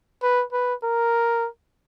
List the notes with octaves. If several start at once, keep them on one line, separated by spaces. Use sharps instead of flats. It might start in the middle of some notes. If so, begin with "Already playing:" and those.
B4
B4
A#4